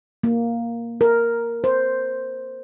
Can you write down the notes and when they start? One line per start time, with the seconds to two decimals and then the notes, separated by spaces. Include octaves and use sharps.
0.24 A#3
1.01 A#4
1.64 C5